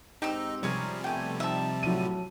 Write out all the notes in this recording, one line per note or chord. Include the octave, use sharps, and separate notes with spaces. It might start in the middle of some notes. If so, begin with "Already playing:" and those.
G#2 C4 D#4 G4 E6
C3 F3 G3 C#4 G#4 A#4
B2 A3 G5 G#5
C4 D#4 E5 A5
A2 F#3 D#7